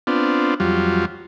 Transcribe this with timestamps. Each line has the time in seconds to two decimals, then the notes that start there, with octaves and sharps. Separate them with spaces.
0.07 B3 C4 D4 F4
0.60 F2 F#3 G3 F4